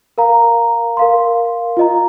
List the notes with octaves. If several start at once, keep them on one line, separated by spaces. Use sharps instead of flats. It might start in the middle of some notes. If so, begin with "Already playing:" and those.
A#4 F5 A#5
A#4 F5 C6
F4 D#5 A#5